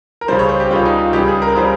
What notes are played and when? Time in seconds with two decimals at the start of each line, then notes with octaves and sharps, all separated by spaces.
0.21 A#4
0.28 C#2 C#3 G3 C5
0.39 C#5
0.49 C5
0.60 G4
0.71 C#2 C#3 G3 F4
0.85 D#4
0.98 F4
1.13 C#2 C#3 G3 G4
1.28 G#4
1.42 A#4
1.56 C#3 G3 C5